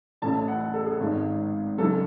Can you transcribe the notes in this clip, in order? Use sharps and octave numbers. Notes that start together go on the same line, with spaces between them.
A1 A2 E3 A5
A5
F#5
F#5
A4
G#4
G#1 G#2 D#3
F#1 F#2 E3 A4